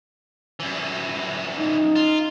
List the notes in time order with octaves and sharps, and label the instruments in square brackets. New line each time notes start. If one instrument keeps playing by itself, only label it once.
[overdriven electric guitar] F#2 E3
[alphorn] D#4
[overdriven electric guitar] F4